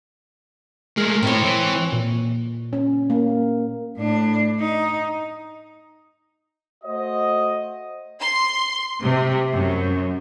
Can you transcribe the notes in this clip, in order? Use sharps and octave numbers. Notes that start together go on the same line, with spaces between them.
G#3 A3 A#4
A2 C4 E4 C#5
E3
A#2
C#4
A#3
A2 D4
D#4
A3 F#4 C5 D#5
C6
C3
F#2